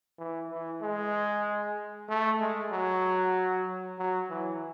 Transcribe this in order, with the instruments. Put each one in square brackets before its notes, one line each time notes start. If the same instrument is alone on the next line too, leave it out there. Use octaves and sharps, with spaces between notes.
[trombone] E3
E3
G#3
A3
G#3
F#3
F#3
E3